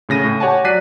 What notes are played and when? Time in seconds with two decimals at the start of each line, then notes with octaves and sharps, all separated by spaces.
0.09 A2 C#3 A#6 D#7
0.24 A2
0.40 G4 C#5 F#5 G#5 A5
0.64 F#3 D5 F#6 B6 C7 D#7